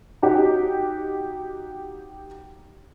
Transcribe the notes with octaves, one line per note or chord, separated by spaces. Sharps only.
D#4 F#4 G4